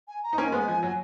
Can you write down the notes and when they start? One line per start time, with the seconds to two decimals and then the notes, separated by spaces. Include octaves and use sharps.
0.08 G#5
0.23 A#5
0.33 D#4
0.38 A#3 C#4 G#5
0.52 G#3 B3
0.68 F3
0.83 F#3